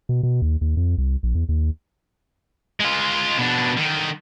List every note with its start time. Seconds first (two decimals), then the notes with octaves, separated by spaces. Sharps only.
0.09 B2
0.23 B2
0.42 D#2
0.61 D#2
0.77 F2
0.98 C2
1.23 A#1
1.35 E2
1.49 D#2
2.80 G#3 F4
3.38 B2 D4
3.77 D3 D#3